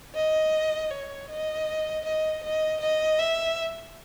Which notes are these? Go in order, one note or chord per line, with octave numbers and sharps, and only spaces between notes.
D#5
C#5
D#5
D#5
D#5
D#5
E5